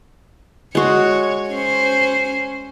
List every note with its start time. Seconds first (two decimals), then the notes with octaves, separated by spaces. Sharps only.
0.75 G#3 F#4 C#5
1.50 C#4 C5